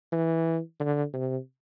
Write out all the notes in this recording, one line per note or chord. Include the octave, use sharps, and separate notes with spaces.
E3
D3
C3